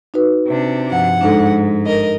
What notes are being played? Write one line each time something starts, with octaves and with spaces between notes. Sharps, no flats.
D#4 F#4 B4
C3 D4
G2 F3 F#5
G#2 D4 D#4 A4
A#4 D#5